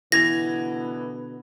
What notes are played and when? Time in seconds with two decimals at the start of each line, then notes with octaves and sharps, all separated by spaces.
0.12 B2 D3 E3 B3 G#6 A#6 F7